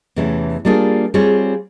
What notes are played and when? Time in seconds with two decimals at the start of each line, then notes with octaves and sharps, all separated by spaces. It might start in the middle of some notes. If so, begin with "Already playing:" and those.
0.16 E2 C3 E3 A3 C#4
0.65 G3 A#3 D4 F4 G#4
1.14 G3 C4 F4 G#4 C#5